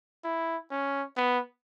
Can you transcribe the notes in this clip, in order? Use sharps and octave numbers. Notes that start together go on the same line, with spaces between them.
E4
C#4
B3